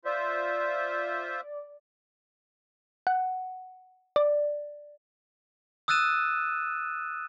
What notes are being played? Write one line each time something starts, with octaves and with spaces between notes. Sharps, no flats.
F4 C5 D5 E5
F#5
D5
D#6 E6 F#6 A6 D#7 E7